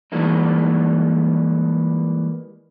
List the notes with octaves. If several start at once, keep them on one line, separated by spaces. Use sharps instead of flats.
E3 G3 G#3 A#3 D#4